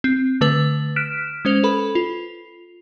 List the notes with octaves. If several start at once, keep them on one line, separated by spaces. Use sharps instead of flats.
C4
D3 A3 B4
F6 F#6 B6 D7 E7
G#3 C#4 C5 G#6 F7
A4 B4 B5
F4